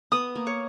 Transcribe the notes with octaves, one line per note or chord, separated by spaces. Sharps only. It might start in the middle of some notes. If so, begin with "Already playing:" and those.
B3 D#6
A#3
C#5